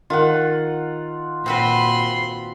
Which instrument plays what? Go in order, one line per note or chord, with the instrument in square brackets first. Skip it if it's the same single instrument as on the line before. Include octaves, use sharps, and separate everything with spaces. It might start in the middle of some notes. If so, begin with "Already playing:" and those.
[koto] D#3 [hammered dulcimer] F4 F#5
[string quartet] A#2 B5 C6 [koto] C4 F#4 B4